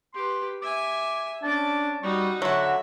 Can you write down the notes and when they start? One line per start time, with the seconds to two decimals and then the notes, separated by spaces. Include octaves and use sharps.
0.14 G4 B4 C6
0.62 E5 G#5 D6
1.43 C#4 D4 A5 D6
2.03 G3 D#4 F#4 C#6
2.42 D3 F#3 F#4 A4 E5